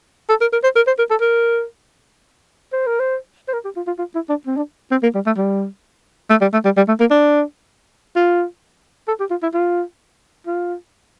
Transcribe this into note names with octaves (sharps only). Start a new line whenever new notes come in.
A4
A#4
A#4
C5
A#4
C5
A#4
A4
A#4
C5
A#4
C5
C5
A#4
G4
F4
F4
F4
E4
D4
C4
D4
C4
A#3
G3
A3
G3
A3
G3
A3
G3
G3
A3
A#3
D4
F4
A4
G4
F4
E4
F4
F4